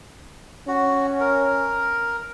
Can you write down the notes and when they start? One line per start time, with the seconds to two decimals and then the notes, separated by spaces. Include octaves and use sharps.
0.68 C#4 F#4
1.20 A#4